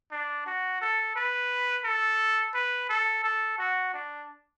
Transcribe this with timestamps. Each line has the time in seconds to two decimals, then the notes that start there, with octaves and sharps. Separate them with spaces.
0.12 D4
0.46 F#4
0.81 A4
1.16 B4
1.84 A4
2.54 B4
2.89 A4
3.24 A4
3.58 F#4
3.94 D4